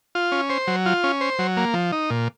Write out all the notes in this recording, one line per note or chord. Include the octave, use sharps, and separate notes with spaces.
F4
C#4
C5
F#3
F4
C#4
C5
F#3
A#3
F3
D#4
A#2